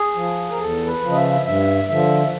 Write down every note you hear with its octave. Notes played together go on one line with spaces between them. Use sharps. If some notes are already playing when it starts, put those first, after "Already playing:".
Already playing: G#4
F3
A#4
E2 A4
B4
C#3 F3
D#5
E5
G2 E5
D3 F3 E5